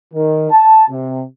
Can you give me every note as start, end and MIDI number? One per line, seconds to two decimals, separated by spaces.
0.14 0.48 51
0.51 0.85 81
0.89 1.22 48